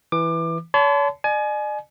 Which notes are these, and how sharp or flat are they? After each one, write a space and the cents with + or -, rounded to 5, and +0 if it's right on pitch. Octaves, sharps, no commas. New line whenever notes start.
E3 +0 D6 +25
C#5 +40 A5 -20 C6 -45
D5 +45 G#5 +30